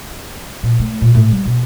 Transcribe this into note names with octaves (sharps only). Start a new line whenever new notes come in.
A#2
A3
A#2
A2
G3
B2